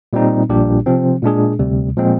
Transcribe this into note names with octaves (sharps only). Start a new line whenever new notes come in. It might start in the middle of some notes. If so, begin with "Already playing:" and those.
A#2 G3 C4 D#4
A#1 A#2 G3 D4 G4
C3 F3 C4
A#2 G#3 D4 G#4
D2 C3 G3
A#2 F3 G#3 C4